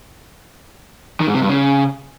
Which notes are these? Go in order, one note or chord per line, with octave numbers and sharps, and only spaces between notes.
D#3
G#2
C3
G2
C#3